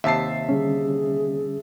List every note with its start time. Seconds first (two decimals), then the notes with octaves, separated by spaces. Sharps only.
0.04 D#2 C3 E5 A5 C7
0.49 D3 G3 C#4 G#4